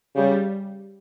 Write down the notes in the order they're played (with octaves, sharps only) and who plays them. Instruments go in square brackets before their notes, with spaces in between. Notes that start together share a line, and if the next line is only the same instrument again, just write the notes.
[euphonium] C#3 [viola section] G3